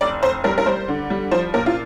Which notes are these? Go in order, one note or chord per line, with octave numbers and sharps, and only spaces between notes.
F1 D5
F1 C5
G3 A#4
A#4
G3 C5
D3
G3
F3 C5
A#2 A#4
F4